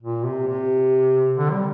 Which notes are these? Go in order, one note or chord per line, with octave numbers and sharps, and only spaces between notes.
A#2
C3
C3
D3
G3